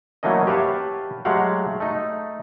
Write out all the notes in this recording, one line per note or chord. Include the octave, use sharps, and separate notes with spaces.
E3 F#3 A3 A#3 C#4 D#5
G4 B4 C#5 F5 A5
F#3 G#3 A3 G4 F5 F#5
A3 D#4